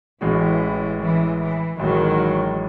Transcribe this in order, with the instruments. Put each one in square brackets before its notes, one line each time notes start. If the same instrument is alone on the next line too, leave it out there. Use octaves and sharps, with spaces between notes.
[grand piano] A1 A2 G#3 C#4 F#4 [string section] E3
[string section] E3
E3
[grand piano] A1 A2 G#3 [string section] D#3 F#3